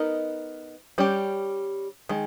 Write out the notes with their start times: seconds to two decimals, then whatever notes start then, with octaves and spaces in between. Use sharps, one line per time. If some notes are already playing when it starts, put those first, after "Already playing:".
Already playing: B3 D#4 A#4 D#5
0.98 G3 C#4 G4
2.09 D#3 G#3